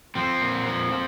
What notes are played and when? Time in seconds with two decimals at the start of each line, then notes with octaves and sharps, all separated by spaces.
0.15 F3 C4
0.41 A#2
0.66 F3
0.92 F3